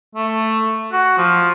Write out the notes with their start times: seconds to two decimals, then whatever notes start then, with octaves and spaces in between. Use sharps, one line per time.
0.15 A3
0.92 F#4
1.18 F3